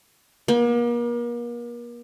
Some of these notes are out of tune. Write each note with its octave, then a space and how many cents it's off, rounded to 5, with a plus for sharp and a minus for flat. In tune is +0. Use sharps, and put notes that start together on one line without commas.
A#3 +40